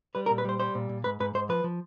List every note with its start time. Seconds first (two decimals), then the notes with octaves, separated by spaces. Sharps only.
0.15 G3 B4
0.26 A#4
0.30 A#2
0.38 B4
0.45 G3 C5
0.60 G3 C5
0.75 A#2
0.89 A#2
1.04 G#2 B4
1.20 G#2 B4
1.34 G#2 C5
1.49 F3 B4
1.64 F3